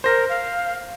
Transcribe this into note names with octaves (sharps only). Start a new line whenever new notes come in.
A#4 C5 A#6
F5